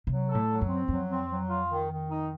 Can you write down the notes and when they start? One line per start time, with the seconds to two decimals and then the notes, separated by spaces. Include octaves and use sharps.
0.07 C3 F#3
0.27 A4
0.34 A2
0.48 F#3
0.61 F#2
0.68 C4
0.88 F2 F#3
1.08 C4
1.29 F#3
1.49 F4
1.69 D#3
1.89 D#3
2.10 D#4